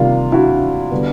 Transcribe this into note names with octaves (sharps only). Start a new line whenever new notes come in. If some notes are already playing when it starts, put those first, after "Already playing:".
Already playing: C3 D#3 G3 A#3 F4
E4 F#4
D3 G3 B3